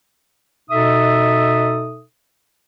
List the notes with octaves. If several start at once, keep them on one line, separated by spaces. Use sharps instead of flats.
B2 D#4 A4 E5 D#6